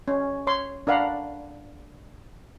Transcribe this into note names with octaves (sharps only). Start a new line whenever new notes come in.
C#4
C#5 C6
D4 A#4 F5 F#5 B5